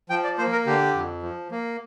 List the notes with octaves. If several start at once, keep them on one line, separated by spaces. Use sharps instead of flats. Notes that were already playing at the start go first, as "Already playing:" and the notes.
F3 G5
D5
A#3 C5
A#4
D3 G4
F2
F3
A#3